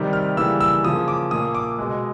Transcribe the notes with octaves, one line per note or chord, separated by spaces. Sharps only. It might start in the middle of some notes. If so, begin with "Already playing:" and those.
Already playing: C3 D#3 G3
F6
C#3 E3 G3 A#3 E6
E6
C#3 F3 A#3 D#6
D6
A#2 F3 A#3 D#6
D6
B2 G#3